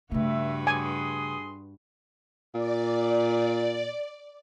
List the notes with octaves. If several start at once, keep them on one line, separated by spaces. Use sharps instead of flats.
G2 C#3 A3 F#4 B4 E5
G#4 G#5 C6 D#6
A#2 D5